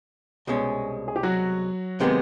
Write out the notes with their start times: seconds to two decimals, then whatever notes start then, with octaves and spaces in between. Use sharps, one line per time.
0.47 C2 B2 G#3 C#4
1.08 G#4
1.16 G4
1.23 F#3 F#4
2.00 C3 D#3 G#3 B3